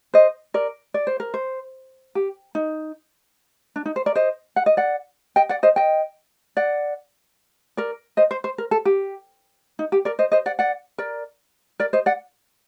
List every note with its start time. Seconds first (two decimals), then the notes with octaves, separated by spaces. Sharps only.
0.14 C5 D#5
0.54 A#4 D5
0.94 D5
1.07 C5
1.20 A#4
1.34 C5
2.15 G4
2.55 D#4
3.76 D4
3.85 D#4
3.96 C5
4.06 A#4 D5
4.15 C5 D#5
4.56 F#5
4.66 D#5
4.77 D5 F#5
5.36 D#5 G5
5.49 D5 F#5
5.63 C5 D#5
5.76 D#5 G5
6.57 D5 F#5
7.77 A#4 D5
8.17 C5 D#5
8.31 C5
8.44 C5
8.58 A#4
8.71 A4
8.85 G4
9.79 D#4
9.92 G4
10.05 A#4 D5
10.19 C5 D#5
10.32 C5 D#5
10.46 D5 F#5
10.59 D5 F#5
10.98 A#4 D5
11.80 A#4 D5
11.93 C5 D#5
12.06 D5 F#5